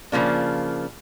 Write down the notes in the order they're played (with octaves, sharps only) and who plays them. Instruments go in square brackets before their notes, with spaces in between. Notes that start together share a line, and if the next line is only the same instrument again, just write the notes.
[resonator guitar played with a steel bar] C#3 F3 A#3 D4